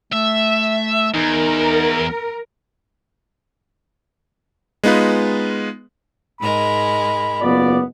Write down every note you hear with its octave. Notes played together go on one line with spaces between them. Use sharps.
A3 E5
E2 D#4 A#4
G#3 B3 D#4 F4 B4
G#2 G#3 A#4 B5
F#1 B3 F4 D5